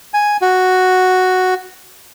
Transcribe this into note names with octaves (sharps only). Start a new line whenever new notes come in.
G#5
F#4